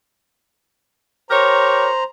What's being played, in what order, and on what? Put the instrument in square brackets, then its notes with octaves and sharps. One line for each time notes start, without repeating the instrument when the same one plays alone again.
[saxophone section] G4 A#4 C#5 [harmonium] C5 A#5